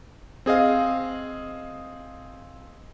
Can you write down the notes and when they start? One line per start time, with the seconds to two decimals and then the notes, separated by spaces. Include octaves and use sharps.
0.46 C4 G#4 D#5 F5